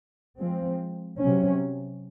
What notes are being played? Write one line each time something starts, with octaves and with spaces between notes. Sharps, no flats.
F3 G#3 C4
C3 F#3 C#4